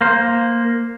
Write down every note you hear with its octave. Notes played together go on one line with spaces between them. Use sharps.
A#3 C5